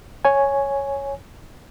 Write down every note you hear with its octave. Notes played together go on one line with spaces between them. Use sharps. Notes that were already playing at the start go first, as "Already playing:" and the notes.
C#5 G#5